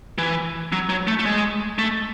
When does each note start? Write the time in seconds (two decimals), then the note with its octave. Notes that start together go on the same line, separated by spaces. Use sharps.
0.18 E3
0.73 F#3
0.89 F#3
1.07 A3
1.19 A3
1.26 G#3
1.78 A3